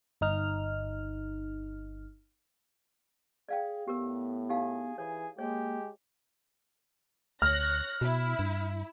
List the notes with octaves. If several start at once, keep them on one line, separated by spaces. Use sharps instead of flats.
G1 D#4 F6
G#4 D5 F5 G5
A2 B3 G4 A#4
D#4 G4 G#4 F5
E3 G#4 C#5
G#3 A#3 G4 C#5
D2 C#5 F6 F#6 A#6
B2 E4
G2